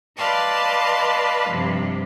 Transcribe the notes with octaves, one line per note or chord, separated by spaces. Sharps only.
B4 D5 D#5 F5 A5 C6
G2 C3 F3